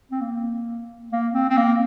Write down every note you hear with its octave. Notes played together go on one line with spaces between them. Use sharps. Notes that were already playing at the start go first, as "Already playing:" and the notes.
C4
A#3
A#3
C4
C4
A#3